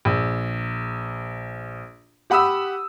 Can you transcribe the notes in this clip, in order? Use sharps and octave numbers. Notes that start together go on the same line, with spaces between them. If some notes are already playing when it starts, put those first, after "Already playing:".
A#1
G4 F#5 B5 D#6 E6